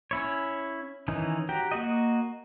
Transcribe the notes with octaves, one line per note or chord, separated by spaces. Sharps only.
C#4 E4 C#5
D#3 E3 C#4 D#4
F#4 G4 G5 A#5
A#3 F#4 D#5